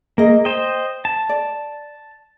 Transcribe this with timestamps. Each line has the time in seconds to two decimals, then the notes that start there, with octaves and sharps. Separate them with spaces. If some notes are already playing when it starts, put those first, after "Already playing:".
0.18 A#3 G#4 D#5
0.45 C5 D#5 G5
1.05 A5
1.29 D5